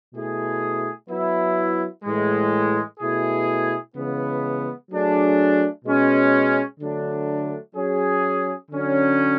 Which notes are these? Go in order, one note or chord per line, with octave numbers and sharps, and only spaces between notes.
B2 A3 E4 G#4
F#3 B3 E4
A2 E3 G#3
B2 A3 E4 G#4
C#3 E3 G#3 B3
F#3 A3 D4 G#4
B2 G#3 C#4
D3 F#3 A3 D4
F#3 C#4 G#4
D3 F#3 C#4